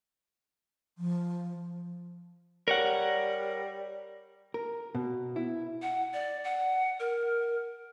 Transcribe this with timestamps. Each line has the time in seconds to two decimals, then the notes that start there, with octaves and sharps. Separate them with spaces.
0.98 F3
2.68 G3 A#4 C#5 F#5
4.54 A#4
4.95 B2
5.36 E4
5.82 F#5
6.13 D5
6.44 F#5
6.99 A#4